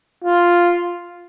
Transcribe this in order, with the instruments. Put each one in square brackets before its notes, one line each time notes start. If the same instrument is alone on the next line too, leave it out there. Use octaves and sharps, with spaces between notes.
[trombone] F4